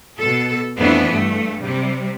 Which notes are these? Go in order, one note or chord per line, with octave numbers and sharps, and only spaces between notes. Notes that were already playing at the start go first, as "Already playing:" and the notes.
B2 A4
F2 E3 A3 B3 D4
G2 A3
C3 G3